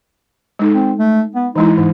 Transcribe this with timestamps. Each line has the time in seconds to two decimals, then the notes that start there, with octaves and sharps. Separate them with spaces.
0.59 G#3 D#4 A4
0.74 C4
0.99 A3
1.35 B3
1.56 E3 G#3 D#4 E4
1.77 G#2 E3